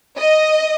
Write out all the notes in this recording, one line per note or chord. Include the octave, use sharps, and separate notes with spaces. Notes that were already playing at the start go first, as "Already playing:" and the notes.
D#5